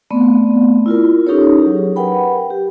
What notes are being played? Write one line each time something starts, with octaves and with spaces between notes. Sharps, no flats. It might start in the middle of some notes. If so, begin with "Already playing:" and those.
A3 B3 C4 D5
E4 F4 A#4
C#4 D#4 G4 A4 A#4 C#5
F#3 G4 G#4
A#4 B4 F#5 G5 B5
G4